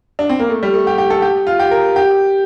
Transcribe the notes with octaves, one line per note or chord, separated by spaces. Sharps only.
D4
C4
A#3
A3
G3
A3
G4
G4
A4
G4
F4
G4
A#4
G4